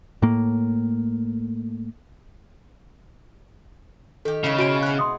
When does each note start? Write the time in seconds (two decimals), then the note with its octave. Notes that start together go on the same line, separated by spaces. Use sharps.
0.22 A2 A#3
4.25 D#3 G4 A4
4.44 C#3 G#3 E4 B4
4.58 B2 F#4 C5 D7
4.83 G#4 F#5 F#6
4.99 C6 D#6